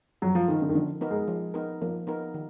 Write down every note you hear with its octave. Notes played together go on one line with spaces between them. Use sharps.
F3 F#3
F3
D#3 B3 D#4 A#4
D3
D#3
D3 F3
B3 D#4 A#4
G#3
F3
B3 D#4 A#4
F3 A#3
B3 D#4 A#4
D#3